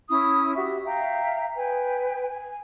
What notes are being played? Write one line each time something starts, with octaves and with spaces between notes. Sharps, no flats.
C#4 E4 D#6
F#4 G4 E5
E5 F5 G5 A#5
B4 G5 G#5
G#5